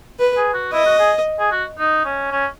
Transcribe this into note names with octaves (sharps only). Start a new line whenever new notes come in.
B4
G#4
F#4
E4 D#5
F#4
G#4
G#4
F#4
D#4
C#4
C#4